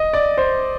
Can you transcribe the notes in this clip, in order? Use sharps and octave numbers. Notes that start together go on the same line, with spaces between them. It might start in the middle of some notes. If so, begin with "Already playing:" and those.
Already playing: D#5
D5
C5